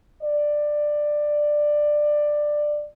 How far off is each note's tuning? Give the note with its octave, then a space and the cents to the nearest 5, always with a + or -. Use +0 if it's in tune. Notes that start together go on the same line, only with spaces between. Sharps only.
D5 +15